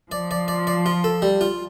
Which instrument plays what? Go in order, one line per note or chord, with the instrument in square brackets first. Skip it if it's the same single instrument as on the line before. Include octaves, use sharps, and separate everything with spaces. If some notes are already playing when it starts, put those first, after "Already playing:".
[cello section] F3 [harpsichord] D5
[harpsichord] D5
D5
D5
F4
A4
G3
F4